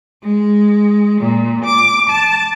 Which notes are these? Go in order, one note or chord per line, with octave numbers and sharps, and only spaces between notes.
G#3
A#2
D6
A5